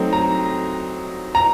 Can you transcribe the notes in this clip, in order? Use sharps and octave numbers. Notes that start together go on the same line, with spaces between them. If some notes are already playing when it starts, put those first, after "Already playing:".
Already playing: F#3 A3 C4 D#4
A#5
A#5